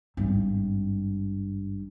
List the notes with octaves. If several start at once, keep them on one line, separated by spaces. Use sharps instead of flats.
G#1 G2